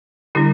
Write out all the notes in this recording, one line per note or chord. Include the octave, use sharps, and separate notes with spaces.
D3 G3 D4 E4 G4